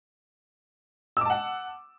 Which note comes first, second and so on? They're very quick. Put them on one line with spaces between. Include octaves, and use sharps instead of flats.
E6 D6 A5 F#5